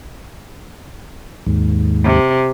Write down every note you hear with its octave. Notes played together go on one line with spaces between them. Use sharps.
D#2 G#2
C3